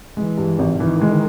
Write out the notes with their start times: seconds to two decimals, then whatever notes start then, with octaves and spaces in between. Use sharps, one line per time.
0.17 E3 G#3
0.38 G2
0.59 G#1
0.80 D#3 E3
1.01 G#3